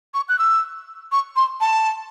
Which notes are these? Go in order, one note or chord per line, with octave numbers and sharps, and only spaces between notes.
C#6
F#6
E6
C#6
C6
A5